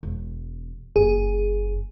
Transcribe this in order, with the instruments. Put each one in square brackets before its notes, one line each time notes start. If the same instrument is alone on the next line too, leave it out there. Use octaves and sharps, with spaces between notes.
[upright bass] E1
[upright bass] F#1 [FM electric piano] G#4